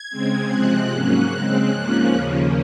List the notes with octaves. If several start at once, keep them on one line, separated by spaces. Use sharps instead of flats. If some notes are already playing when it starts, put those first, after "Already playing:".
Already playing: G#6
C#3 G#3 C4
C3 F3 G#3 C4 F#6
G#2 F#3 A#3 C#4 F#6
C#3 G#3 C4
G#2 F3 A#3 C#4
D#2 C#3 F3 A#3 C#4